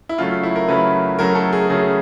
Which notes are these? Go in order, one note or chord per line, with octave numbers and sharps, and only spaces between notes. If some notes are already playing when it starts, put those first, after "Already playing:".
E4
C#3 F#3 A3 F4
F4
E4
A#4
C#3 F#3 A3 B4
C#3 F#3 A3 A#4
A4
G#4
C#3 F#3 A3 G#4